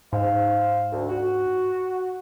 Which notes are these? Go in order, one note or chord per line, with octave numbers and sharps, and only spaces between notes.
G#2 C5 F5
D2
F#4